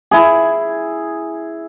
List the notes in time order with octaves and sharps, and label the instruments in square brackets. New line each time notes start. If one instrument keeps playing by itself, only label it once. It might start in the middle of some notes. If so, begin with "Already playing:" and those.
[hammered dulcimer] E4 G#4